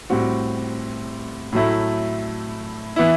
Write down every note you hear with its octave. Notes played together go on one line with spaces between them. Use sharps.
A2 G3 C4 F#4
A2 F#3 A3 E4
E3 B3 E4